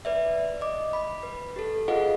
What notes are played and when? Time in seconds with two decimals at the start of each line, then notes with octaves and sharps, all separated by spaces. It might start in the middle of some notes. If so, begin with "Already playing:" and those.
0.05 B4 D5 E5
0.61 D#5 D6
0.93 B5
1.23 B4
1.56 G4 A4
1.88 F4 G#4 B4 D#5 F5 F#5